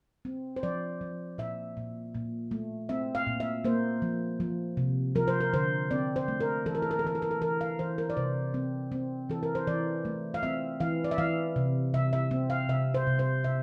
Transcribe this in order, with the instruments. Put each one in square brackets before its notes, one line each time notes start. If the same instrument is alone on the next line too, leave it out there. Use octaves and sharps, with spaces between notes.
[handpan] C4
C5
F3 D5
F3
A#2 E5
A#2
A#2
A3
C4 E5
F5
A#2
E5
A#3 C5
F3
F3
C3
F3 A#4
C5
A#4
D3 C5
C4 D5
C5
A3
A#4
E3 A4
A#4
A4
A#4
A4
E3 A#4
A4
A#4
A4
E3 A#4
F5
E3 C5
A#4
D5
C3 C5
C4
C4
E3 A4
A#4
C5
E3 D5
A3
F5
C4 E5
E3 F5
D5
E5
E3 F5
C3
C3 E5
E5
C4
F5
C3 E5
C5
C3
C5
C3 E5